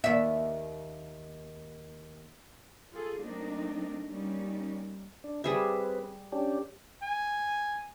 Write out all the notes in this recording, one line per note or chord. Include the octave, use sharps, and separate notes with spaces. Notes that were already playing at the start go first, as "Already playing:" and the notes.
D#2 E5
F4 G#4 A4
F#3 A3 A#3 C4 D4 D#4
G3 A#3 C#4 D#4
D4
G3 C4 G#4 B4 E5
C#4 D4 G4
G#5